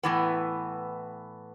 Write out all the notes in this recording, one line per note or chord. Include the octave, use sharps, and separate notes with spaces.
A2 E3 B3